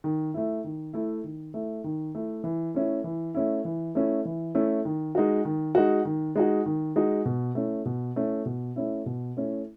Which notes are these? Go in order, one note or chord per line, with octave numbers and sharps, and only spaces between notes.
D#3
A3 E4
D#3
A3 E4
D#3
A3 E4
D#3
A3 E4
E3
A3 C#4 E4
E3
A3 C#4 E4
E3
A3 C#4 E4
E3
A3 C#4 E4
D#3
G#3 D#4 F#4
D#3
G#3 D#4 F#4
D#3
G#3 D#4 F#4
D#3
G#3 D#4 F#4
B2
A3 C#4 E4
B2
A3 C#4 E4
B2
A3 C#4 E4
B2
A3 C#4 E4